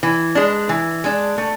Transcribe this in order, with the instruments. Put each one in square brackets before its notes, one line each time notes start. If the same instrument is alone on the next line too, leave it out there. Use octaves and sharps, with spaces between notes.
[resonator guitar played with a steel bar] E3
G#3 D4
E3
G#3 D4
A3